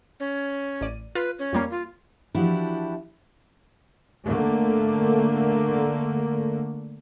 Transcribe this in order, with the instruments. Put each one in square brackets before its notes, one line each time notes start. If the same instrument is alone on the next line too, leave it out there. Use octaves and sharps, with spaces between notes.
[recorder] C#4
[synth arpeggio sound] A1 D5 D#7
[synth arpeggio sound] F4 [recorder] B4
[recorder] C#4
[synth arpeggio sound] F2 G3 A#3
[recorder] F4
[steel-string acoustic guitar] E3 F3 D4 E4 F#4 G4
[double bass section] D3 A3 A#3